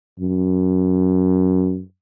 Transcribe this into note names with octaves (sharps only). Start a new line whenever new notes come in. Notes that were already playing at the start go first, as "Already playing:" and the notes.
F#2